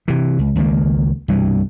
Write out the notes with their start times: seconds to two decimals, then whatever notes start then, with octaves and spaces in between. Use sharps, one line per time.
0.08 C3 E3
0.39 C#2
0.56 C#2 D#3 A#3
1.28 C2 G2 B2 E3